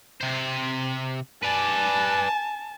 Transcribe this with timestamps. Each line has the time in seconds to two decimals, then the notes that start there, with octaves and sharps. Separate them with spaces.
0.21 C3 C5
1.43 B4 D5 G#5 A5